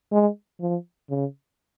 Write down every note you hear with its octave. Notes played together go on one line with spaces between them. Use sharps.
G#3
F3
C#3